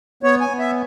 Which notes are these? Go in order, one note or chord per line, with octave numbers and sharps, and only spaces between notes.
B3 C#5
G#5
B3
E5